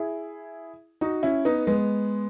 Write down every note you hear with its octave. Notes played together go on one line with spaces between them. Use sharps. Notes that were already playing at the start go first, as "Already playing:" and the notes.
Already playing: E4 G#4
D#4 F#4
C#4 E4
B3 D#4
G#3 B3